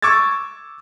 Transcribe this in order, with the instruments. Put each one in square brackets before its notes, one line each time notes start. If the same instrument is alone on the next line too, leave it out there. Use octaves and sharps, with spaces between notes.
[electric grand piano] C#6 D6 E6 G#6 A6